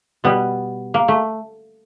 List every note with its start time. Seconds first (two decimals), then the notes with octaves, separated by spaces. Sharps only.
0.24 B2 G3 B3
0.94 A#3
1.08 A3